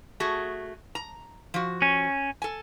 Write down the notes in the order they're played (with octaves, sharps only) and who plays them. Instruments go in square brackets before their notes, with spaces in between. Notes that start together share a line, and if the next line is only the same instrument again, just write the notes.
[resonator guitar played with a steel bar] A3 F#4 G#4
A#5
F3 F#4
[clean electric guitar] C#4
[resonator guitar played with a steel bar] A4 G#5